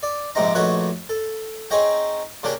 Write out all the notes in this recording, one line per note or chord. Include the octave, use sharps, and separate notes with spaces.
D5
A#1 G#2 C3 C4 D#4 A#5
A#1 A3 D#4 F#4 B4 C#5
A4
C4 D#4 G#4 C#5 D#5 G5
C#3 A#3 C#4 D4 G4 A#4